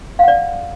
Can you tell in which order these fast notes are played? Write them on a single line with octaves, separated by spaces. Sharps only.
F5 F#5 D5